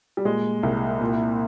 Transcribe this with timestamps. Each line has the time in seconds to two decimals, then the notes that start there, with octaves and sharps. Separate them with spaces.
0.17 G3
0.25 A#2 G#3
0.63 C2
1.01 A#2